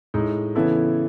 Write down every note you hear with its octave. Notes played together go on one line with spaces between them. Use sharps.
A2 G#3 D#4
C#3 E3 B3 E4 A4